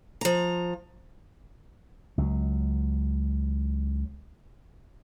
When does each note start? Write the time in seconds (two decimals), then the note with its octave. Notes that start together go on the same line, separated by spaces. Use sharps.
0.21 F3 A#5
2.18 C#2 F#3